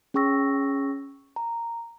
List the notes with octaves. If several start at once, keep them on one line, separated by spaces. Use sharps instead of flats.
C#4 G#4 G5 C#6 E6 A#6
A#5